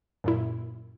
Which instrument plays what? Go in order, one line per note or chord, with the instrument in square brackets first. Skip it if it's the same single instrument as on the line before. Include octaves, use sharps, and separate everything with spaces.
[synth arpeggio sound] F#2 A#2 E4